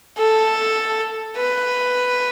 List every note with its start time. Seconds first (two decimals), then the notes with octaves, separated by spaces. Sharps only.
0.18 A4
1.37 B4